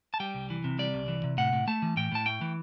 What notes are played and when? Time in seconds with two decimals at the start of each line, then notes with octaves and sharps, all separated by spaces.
0.14 A5
0.20 G3 G5
0.34 C2
0.50 E3
0.64 C3
0.79 G3 D5
0.94 C2
1.08 E3
1.24 C3
1.38 A2 F#5
1.53 A2
1.68 A3 A5
1.82 E3
1.97 A2 G5
2.12 A2 A5
2.26 A3 G5
2.41 E3